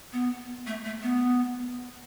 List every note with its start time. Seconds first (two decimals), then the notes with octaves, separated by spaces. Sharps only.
0.13 B3
0.67 A3
0.85 A3
1.03 B3